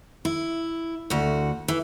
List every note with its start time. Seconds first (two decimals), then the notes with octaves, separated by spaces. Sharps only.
0.25 E4
1.10 D2 F#4
1.68 E3